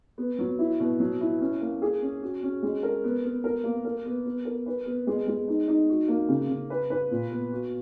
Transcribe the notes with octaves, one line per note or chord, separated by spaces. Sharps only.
B3
F#3
E4
B2
F#3
E4
C#4
A#3
G#4
C#4
F#4
C#4
G#3
A#4
B3
B3
A#4
A#3
A#4
B3
B3
A#4
B4
B3
G#3
G#3
D#4
D#4
F#4
A#3
C#3
C#3
B4
B4
A#2
B3
F#4